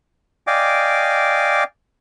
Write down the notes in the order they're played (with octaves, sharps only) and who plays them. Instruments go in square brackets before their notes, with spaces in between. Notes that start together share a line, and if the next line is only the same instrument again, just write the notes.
[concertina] D5 D#5 F5 G5 G#5 D6